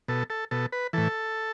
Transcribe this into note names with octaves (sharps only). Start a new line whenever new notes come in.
B2 A4
A4
B2 A4
B4
A2 E3 A4